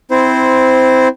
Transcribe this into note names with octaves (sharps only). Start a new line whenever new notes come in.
C4 E4 C5